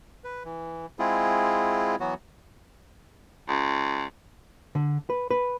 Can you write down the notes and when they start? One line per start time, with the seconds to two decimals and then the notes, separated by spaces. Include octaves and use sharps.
0.24 B4
0.44 E3
0.99 G#3 C4 E4 F4 G#4
2.00 E3 F#3 B3 F#4
3.49 C#2
4.75 D3
5.10 B4
5.31 B4